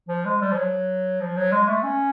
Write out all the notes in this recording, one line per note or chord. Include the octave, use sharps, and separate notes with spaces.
F3
G#3
G3
F3
F#3
F3
F#3
G#3
A3
C#4